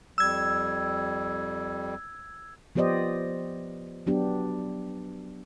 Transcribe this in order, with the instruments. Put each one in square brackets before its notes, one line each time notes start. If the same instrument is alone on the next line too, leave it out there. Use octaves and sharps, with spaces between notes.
[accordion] F2 G3 [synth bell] E6 G#6
[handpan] F3 B3 G4 C5 D5 D#5
F#3 B3 D4 G4